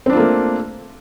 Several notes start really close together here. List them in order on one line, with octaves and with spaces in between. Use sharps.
C4 D4 F4 A#3 A3